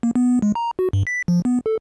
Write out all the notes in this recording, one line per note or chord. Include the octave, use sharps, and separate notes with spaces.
A#3
B3
G#3
A#5
F#4
G2
B6
F3
B3
A4